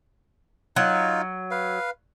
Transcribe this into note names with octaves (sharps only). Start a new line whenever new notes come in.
F#3 D#4 F4
B4 F5